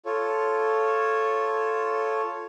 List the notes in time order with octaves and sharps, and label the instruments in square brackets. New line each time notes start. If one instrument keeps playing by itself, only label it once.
[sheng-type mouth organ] F4 A4 C#5